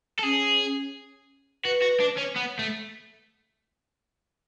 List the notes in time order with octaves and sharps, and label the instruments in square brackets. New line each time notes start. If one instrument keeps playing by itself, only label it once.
[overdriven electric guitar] A4
[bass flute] C#4 [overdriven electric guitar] G#4
[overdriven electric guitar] F#4 [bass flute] B4
[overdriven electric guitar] F#4
D4
C#4
B3
A3